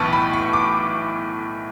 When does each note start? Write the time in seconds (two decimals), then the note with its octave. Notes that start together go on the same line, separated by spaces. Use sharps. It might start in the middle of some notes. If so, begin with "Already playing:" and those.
Already playing: B1 A2 E3 B3 A5 C#6
0.13 B5
0.33 C#6
0.53 D6